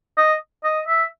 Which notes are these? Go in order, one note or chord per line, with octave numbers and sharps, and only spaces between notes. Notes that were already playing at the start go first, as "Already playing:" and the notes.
D#5
D#5
E5